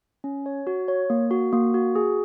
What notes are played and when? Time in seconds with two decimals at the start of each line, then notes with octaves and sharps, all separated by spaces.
0.24 C#4
0.46 C#5
0.67 F#4
0.88 C#5
1.10 A#3
1.31 F#4
1.53 A#3
1.74 F#4
1.95 G#4